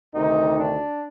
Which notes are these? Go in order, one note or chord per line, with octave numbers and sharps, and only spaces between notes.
D2 C3 D#3 D#4
D4